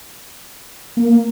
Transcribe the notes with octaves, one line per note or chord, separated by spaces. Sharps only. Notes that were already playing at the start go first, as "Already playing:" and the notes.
A#3